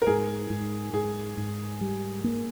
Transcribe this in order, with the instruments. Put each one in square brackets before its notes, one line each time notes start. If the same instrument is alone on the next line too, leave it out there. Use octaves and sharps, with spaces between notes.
[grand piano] A#4
[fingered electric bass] G#2 [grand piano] G#4
[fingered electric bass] G#2
[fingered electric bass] G#2 [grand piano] G#4
[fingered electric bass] G#2
G3
A#3